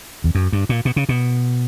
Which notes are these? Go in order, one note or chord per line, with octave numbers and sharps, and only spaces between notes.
E2
F#2
G2
A#2
B2
C#3
B2